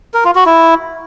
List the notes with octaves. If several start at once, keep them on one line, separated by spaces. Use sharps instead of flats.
A#4
F4
F#4
E4